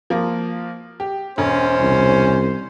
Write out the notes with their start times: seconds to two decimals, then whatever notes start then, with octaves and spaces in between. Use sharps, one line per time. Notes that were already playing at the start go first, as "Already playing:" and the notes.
0.10 F3 A#3
1.00 G4
1.38 E1 C#4 C5
1.80 C2